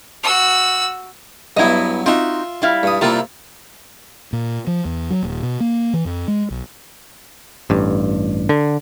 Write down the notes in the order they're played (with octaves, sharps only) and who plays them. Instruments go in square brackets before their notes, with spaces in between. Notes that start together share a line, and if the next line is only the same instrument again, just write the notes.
[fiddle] F#4 E6
[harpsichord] G2 F#3 B3 [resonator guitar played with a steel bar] E4 D#5
[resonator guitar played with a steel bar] C4 D#4 F#4 [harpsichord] F4 E5
[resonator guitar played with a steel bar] G3 E4 F5
[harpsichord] G2 D#6
[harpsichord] C3 A#3 E4 [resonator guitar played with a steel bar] G3 F4
[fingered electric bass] A#2
F3
E2
F#3
D#1
B2
A#3
E3
F2
G#3
B1
[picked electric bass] A1 G2
D3